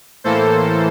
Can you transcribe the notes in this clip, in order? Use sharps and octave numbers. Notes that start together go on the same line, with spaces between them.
A2 E3 A#3 A4 C5